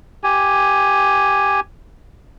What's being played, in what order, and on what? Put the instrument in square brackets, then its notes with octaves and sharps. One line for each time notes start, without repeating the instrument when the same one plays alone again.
[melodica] G4 G#5